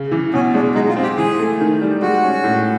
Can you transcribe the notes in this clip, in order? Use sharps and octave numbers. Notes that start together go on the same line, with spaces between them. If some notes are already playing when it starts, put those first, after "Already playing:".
Already playing: C#3
E3
B2 C#4
G#3 D4
G#3 D#4
F4
C4
G4
E3 G#4
A3
D#3
G3
G#3 F#4
C#4
A2